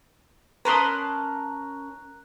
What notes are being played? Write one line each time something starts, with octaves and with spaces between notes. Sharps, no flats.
C#4 A#4 B4 A5 A#5 C6 D#6 F#6